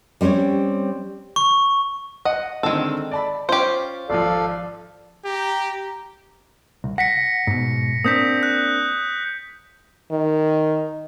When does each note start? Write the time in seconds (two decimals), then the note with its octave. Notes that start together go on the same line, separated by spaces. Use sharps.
0.21 G3 C4 C#4 G4 C#5
1.36 C#6
2.25 D#5 F#5
2.63 D3 D#3 G#3 C4 A4
3.11 D5 A5 B5
3.49 C#4 F4 G4 C5
4.10 G#1 F3 A4 D5 F5
5.25 G4 A#5
6.84 C2
6.98 F#5 A#6 B6 C#7
7.47 G#2 B2
8.04 A#3 C4 D4 D#6 G6 B6
8.43 F#6
10.12 D#3